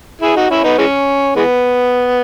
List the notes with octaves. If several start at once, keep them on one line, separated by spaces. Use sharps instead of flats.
E4 G#4
D#4 F#4
C#4 E4
B3 D#4
E3 G#3 C#4
E3 G#3 B3